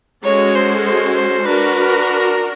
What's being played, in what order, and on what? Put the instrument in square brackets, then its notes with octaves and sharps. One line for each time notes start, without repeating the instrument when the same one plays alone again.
[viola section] G#3 C#4 F#4 A4 [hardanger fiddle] C#5
[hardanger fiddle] C5
C5
C5
[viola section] D4 F#4 A#4 [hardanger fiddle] B4